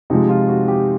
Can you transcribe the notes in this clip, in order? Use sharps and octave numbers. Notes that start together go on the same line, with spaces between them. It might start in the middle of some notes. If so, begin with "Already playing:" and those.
C3 F3 G#3 D#4
F4
F#4
G4